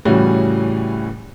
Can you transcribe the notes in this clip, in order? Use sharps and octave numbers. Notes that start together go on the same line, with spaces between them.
A2 C#3 E3 G3 C#4 F#4